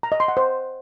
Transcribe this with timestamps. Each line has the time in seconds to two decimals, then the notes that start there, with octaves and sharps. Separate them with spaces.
0.03 A#5
0.12 D#5
0.20 C6
0.28 F#5
0.37 C5